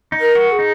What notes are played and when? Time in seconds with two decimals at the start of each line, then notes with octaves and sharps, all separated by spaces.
0.12 D#4
0.20 A#4
0.35 F#4
0.51 G#4
0.59 D#4